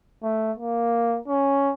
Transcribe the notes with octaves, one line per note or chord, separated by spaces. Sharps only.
A3
A#3
C#4